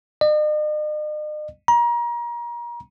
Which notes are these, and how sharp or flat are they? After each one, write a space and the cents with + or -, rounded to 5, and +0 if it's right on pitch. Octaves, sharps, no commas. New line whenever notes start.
D#5 -45
A#5 +30